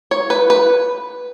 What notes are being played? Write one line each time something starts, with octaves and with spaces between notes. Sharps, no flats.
C#5
B4
B4